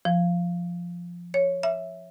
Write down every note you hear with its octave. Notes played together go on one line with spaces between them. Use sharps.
F3
C#5
E5